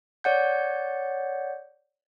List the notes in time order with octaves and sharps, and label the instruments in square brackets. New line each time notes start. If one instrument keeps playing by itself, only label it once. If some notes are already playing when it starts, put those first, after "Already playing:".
[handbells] C#5 D5 F#5 G6